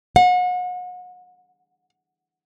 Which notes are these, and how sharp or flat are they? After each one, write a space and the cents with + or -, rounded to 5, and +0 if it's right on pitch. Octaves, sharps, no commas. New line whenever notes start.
F#5 -35